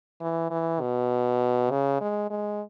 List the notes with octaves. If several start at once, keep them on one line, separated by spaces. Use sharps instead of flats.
E3
E3
B2
C#3
G#3
G#3